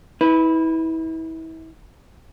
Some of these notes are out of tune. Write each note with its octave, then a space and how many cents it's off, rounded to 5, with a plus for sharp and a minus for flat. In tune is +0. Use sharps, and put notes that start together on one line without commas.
E4 -35 B4 +0